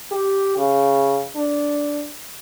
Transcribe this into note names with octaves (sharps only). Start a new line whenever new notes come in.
G4
C#3
D4